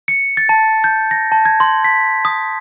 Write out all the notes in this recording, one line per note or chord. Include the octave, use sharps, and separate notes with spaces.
C#7
A6
A5
G6
A#6
A5
G#6
C6
B6
D#6